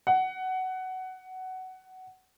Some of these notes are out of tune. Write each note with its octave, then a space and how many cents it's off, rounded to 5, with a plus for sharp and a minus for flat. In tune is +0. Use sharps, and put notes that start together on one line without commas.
F#5 +15